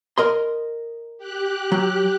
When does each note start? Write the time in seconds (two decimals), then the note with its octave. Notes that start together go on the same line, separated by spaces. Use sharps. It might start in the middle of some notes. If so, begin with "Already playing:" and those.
0.18 A#4 D#5 C6
1.18 G4 F#6
1.72 F#3